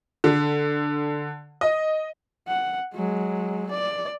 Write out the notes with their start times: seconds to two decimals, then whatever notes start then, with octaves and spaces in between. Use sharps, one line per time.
0.24 D3
1.61 D#5
2.48 F#5
2.94 F#3 G#3
3.71 D5